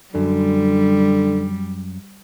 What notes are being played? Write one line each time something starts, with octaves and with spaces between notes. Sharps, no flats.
F#2 D3 G3